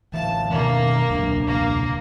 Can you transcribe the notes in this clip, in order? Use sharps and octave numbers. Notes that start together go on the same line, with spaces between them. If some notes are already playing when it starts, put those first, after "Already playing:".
D2 E3 A3 E5 F5 A5
B2 D#3 A#3 D4
E1 C#2 F#3 D4
A#3